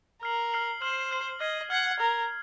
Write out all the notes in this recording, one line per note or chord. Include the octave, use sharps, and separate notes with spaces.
A#4 F6 C7 F#7
F6 C7 F#7
C5 F6 C7 F#7
F6 C7 F#7
D#5 F6 G#6 C7
F#5 F6 G#6 C7
A#4 F6 G#6 C7